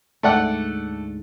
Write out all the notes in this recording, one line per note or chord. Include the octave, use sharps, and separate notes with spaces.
D2 G#2 A3 D5 F#5